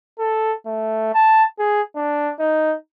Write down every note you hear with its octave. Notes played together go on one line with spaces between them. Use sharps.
A4
A3
A5
G#4
D4
D#4